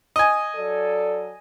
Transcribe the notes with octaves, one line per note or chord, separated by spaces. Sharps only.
D#5 G#5
F#3 A4 D5